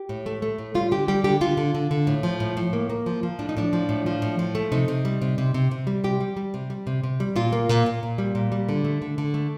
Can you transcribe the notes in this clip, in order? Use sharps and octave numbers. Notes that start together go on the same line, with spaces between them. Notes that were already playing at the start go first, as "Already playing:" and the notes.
Already playing: G4
A2
A3
A3
A2
G3 F4
D3 G4
G3 G4
D3 G4
D3 F4
D3
D3
D3
A2
F3
A2
A2
A#3
A#3
F3
F3
A2 D4
D#4
A2 D4
F3
A2
F3
A2
F3
A3
C3 D#4
C3
G3
C3
C3
C3
C3
G3
C3 G4
G3
G3
C3
G3
C3
C3
G3
A#2 F4
A#3
A#2
A#2
A#2
G3
A#2
G3
D3
A3
D3
D3
A3